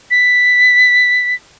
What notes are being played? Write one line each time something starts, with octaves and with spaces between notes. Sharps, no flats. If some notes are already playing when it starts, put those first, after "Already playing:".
B6